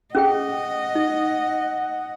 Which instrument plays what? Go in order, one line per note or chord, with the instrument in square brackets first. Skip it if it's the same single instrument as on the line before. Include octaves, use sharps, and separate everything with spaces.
[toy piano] C#4 G#4 G5 [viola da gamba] D#5 [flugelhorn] F#5
[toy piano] D#4